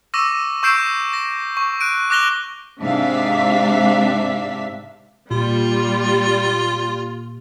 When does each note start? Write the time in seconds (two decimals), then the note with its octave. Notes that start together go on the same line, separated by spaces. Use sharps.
0.14 C#6 D6 E6 A#6 D#7
0.63 C#6 E6 G6 C7 D7 E7
1.13 A#6
1.57 C#6
1.80 F#6 D7 D#7
2.10 D6 F#6 A#6 F7 G7
2.81 G#2 C3 D4 E5 F5 B6
5.31 A#2 G3 F4